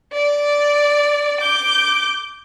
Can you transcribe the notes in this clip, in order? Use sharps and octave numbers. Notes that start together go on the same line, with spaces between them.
D5
D6 G6